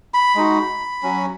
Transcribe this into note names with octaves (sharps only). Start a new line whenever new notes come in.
B5
G#3 D#4 F#4
F#3 C#4 F#4